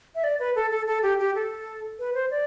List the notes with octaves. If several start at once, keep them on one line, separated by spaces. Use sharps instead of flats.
E5
D5
B4
A4
A4
A4
G4
G4
A4
B4
C5
D5